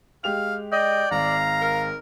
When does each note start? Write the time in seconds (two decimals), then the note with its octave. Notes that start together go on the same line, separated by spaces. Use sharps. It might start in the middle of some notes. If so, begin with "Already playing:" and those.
0.24 G#3 G4 F5 F7
0.72 D5 D#5 G5
1.12 G#1 F5 A#5
1.61 A#4